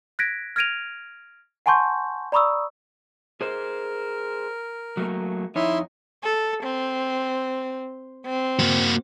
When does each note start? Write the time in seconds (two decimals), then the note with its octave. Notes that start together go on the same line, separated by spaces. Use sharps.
0.19 F#6 G#6 A#6 B6 D7
0.56 F6 G#6 A#6 D7 D#7 F7
1.66 F#5 G#5 A5 C6 C#6 G6
2.32 D5 A#5 B5 C#6 D#6 E6
3.41 G#4 A#4 C5
4.97 F#3 A3 A#3
5.56 F2 D#4 E4 C#5 E5 C6
6.24 A4
6.64 C4
8.25 C4
8.59 A#3 F#4